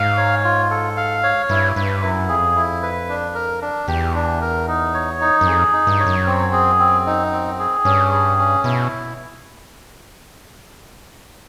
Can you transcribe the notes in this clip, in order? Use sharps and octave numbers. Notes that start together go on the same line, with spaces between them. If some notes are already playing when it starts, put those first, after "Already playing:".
Already playing: G#2 F5
C#5
F4
A4
F5
C#5
G2 E4
G2 B4
F#2 E4
F2 G#4
E4
B4
D4
A#4
D4
E2 G4
D4
A#4
D#4
C#5
D#4
F#2
F2 G#4
D#4
G2
C#5
F#2
C4
G#4
C4
D#4
C4
G#4
G2 C#4
G#4
C#4
B2 E4